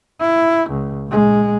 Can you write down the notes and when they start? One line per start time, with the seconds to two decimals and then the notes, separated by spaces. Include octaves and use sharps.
0.20 E4
0.71 C#2
1.07 A#1 G#3